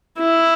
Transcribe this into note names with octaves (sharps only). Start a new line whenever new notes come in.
E4